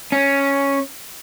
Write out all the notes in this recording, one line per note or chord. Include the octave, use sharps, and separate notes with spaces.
C#4